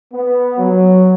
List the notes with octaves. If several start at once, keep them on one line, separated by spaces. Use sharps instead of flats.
B3
F#3